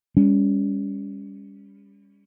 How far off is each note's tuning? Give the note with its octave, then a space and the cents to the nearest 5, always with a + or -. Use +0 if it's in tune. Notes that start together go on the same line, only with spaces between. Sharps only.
G3 +40 C#4 +20